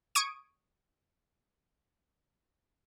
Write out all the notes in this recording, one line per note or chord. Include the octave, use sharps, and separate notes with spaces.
C#6 D#6 G#6 D7 D#7